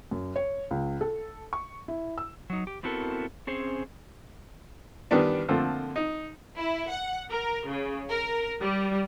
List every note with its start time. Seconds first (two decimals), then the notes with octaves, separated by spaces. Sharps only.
0.11 F#2
0.36 C#5
0.71 C#2
1.01 A4
1.53 C#6
1.88 E4
2.18 E6
2.50 F#3 D#4
2.67 G4
2.83 B3 C4 E4 F#4 A4 A#4
3.47 C4 C#4 G#4 C5
5.11 D#3 E3 G3 B3 D4
5.48 D3 F3 A3 A#3 C4
5.96 D#4
6.58 E4
6.90 F#5
7.31 A#4
7.66 C#3
8.10 A#4
8.61 G3